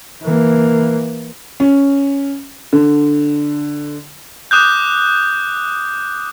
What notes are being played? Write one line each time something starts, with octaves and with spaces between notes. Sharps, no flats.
E3 A#3
C#4
D3
D6 D#6 F#6 G6